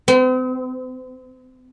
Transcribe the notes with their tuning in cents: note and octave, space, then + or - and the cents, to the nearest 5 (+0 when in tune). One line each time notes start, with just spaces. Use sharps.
C4 -40